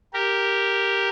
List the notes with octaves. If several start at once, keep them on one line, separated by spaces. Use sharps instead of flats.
G4 A#4